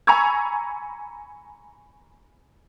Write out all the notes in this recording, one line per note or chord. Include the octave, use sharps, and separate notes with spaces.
G#5 A#5 B5 C#6 E6 G#6